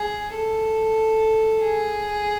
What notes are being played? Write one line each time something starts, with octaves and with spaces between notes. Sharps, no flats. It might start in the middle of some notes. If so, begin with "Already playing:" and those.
Already playing: G#4
A4
G#4